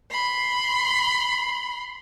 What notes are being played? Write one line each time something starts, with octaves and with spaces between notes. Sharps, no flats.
B5 C6